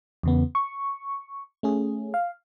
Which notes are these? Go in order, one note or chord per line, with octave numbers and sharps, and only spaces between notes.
E2 C#3 B3
C#6
A3 C#4 G#4
F5